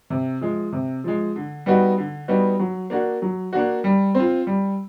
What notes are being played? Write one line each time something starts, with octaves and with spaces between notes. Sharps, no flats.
C3
F3 G#3
C3
F3 G#3
D3
G3 B3 D#4 F#4
D3
G3 B3 D#4 F#4
F#3
A#3 D4 F#4
F#3
A#3 D4 F#4
G3
C4 F4
G3